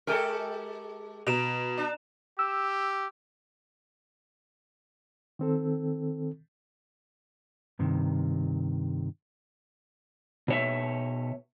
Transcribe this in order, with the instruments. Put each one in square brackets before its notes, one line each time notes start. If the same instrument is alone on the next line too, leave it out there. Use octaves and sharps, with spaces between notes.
[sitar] G#3 G4 A4 [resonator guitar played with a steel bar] A#4 G5 G#5
[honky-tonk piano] B2 D7 [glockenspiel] A#5 E7 F7
[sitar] D4
[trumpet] G4 [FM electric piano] E6
[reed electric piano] D#3 C4 A4
[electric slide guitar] G2 C3 D#3
B2 C#5 E5